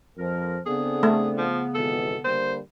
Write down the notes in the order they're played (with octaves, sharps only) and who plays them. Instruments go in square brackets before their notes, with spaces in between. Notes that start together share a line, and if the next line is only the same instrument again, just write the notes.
[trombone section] F2 [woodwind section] F3 A#4
[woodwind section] C#3 B3 [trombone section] C4 D4 A4 [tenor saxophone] G#4
[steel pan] A3
[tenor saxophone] F3
[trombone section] G#1 B2 E3 [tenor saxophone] A4
[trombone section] D3 G3 A#3 [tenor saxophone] C5